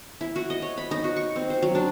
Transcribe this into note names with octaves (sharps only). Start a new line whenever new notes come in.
E4
F#4
D#5
C#5
B5
D#4
F#4
C#6
C4
C5
F#3
D4